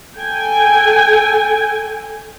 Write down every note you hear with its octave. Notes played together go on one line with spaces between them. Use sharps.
A4 G5 G#5